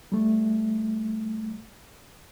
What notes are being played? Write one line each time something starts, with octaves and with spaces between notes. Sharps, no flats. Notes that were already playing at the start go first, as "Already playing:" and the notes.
G3 A3